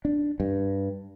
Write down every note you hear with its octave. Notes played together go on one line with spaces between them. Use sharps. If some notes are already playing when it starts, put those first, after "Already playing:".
D4
G2